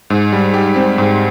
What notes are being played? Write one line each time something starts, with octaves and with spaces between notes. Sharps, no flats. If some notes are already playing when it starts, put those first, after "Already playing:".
G#2
G3
G4
C4
G#2